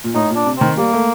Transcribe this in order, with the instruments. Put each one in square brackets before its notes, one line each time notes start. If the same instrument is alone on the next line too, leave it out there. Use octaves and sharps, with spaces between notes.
[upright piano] A#2
[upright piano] A2 [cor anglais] D#4
[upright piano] A#2
[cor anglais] D4
[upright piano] C3
[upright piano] D#3 [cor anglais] C4
[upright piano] G3 [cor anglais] A#3
[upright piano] A3